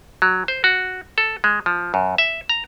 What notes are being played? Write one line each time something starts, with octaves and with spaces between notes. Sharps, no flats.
F#3
C5
F#4
A4
G#3
F3
F#2
E5
A#5